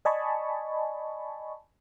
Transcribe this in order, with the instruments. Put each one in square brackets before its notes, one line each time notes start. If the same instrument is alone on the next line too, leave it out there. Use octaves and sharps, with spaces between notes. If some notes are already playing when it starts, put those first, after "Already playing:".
[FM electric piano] D5 D#5 G#5 A5 B5 C#6